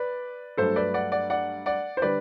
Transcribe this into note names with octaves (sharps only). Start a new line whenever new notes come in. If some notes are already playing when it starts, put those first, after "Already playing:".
Already playing: B4 D5
G2 F#3 A3 A4 C5
B4 D5
D5 F#5
D5 F#5
D5 F#5
D5 F#5
C5
D3 G3 B4 D5